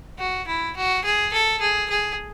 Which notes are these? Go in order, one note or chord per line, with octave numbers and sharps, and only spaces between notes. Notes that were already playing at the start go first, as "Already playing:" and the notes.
F#4
E4
F#4
G#4
A4
G#4
G#4